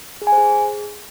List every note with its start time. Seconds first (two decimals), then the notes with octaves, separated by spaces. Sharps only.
0.22 G#4
0.27 G#5
0.32 C5
0.38 G#4